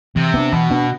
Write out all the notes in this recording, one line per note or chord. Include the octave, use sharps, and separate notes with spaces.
C3 E3
B3 D4
B2 E3
B3 D4